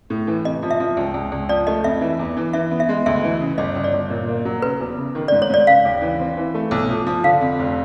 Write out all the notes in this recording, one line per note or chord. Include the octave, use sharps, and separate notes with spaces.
A2
E3
C3 D#5
F3
E5
F3
C#2
C#2
C#2
F3 D5
A3 D#5
F2 E5
E3
E2
E3
E3 E5
B3
E5
G#3
D2 E5
E3
C#3
G1 D#5
G1
D5
G1
A#2
A#3
F#3
C#3 B4
E2
C#3
D#3
D5
G#2
C#5
G#2 D5
C#3 F5
D#2
E3
C4
E3
A3
B1
F3
F3
D3 F5
F2
F1